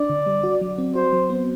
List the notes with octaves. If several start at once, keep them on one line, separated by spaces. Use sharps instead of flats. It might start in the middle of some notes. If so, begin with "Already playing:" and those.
Already playing: D4 D5
D3
G3
F#4
F#3
C4
F#4 C5
F#3
B3